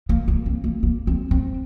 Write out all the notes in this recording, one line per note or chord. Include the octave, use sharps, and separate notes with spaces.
A#3
A#3
C4
A#3
A#3
C4
C4